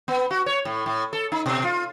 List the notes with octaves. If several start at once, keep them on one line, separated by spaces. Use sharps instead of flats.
B3
F#4
C#5
A2
A2
A4
D#4
B2
F4